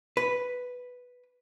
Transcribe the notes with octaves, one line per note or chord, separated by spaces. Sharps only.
B4